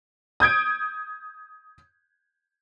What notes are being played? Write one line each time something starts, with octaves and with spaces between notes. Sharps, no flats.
D#6 G6 G#6 D7